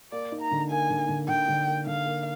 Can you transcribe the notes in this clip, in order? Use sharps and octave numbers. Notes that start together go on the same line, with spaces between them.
A#3 D5
D#4
A#5
D3
A#3 G#5
D3
D3
D3 G5
D3
A#3
D3 F5
A#3